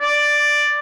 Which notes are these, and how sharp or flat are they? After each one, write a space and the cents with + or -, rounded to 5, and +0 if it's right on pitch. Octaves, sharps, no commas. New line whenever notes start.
D5 +5